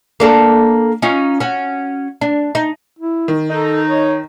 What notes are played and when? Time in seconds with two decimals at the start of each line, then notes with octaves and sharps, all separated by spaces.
0.20 A#3 D4 A4
1.02 C#4 D#4 F4
1.40 C#4 F#4
2.21 D4
2.55 D#4
2.99 E4
3.28 D#3
3.50 D#4 A4
3.88 C#5